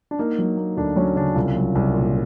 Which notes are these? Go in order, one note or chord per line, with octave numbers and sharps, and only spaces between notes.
D4
A#3 D#4
F#3
A#3
D2 D4
F#3 C#4
C#3 D4
C2 F4
F#3
C2
A#2